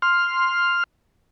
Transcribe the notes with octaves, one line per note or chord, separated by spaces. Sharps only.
C6 F6